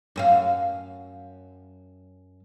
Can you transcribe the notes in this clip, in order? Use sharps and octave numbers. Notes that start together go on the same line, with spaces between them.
F#2 G#4 F5